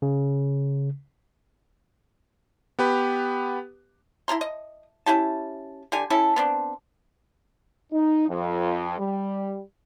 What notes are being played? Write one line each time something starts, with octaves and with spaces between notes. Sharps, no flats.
C#3
B3 G4 B4
E4 G#4 A#5 C6
D#5
C#4 E4 G4 A5
D3 G4 G#5
C#4 E4 A4
B3 C4 D4
D#4
F2
G3